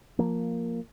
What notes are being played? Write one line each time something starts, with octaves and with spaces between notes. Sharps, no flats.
F3 A#3